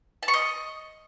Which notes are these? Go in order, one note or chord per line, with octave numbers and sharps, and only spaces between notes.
A5
C#6
D#5